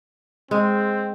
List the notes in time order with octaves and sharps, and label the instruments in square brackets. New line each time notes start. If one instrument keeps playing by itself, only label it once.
[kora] G#3 [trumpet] C4